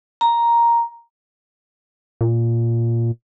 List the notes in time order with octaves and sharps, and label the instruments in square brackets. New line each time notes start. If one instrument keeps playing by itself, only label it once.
[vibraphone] A#5
[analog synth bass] A#2